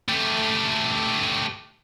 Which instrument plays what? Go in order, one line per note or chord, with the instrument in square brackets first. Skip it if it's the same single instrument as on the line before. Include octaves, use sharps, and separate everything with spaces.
[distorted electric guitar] A3 G4